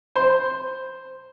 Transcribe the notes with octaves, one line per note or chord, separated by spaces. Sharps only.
C5